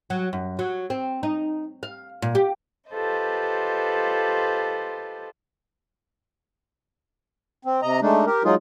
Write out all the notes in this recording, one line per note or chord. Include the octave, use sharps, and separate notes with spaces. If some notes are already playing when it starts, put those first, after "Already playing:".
F#3
F#2
F#3
C4
D#4
F5
A#2
G4
F4 G4 A4 B4 C5 D#5
C4
C3 D#5 A#5
G#3 A3 D4 D#4
G4 A#4
F#3 G#3 D#4 F4 G#4